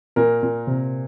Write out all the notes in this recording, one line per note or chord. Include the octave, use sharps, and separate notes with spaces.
A#2 A#4
A#2
C3